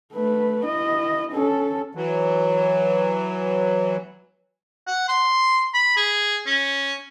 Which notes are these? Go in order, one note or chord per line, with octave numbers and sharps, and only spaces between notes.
A3 B4
E4 D#5
C#4 A4
E3 F#3
F#5
C6
B5
G#4
C#4